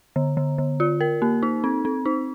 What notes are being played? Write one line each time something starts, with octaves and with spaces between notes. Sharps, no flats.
D3
D3
D3
F4
A#4
A#3
D#4
C4
C4
D#4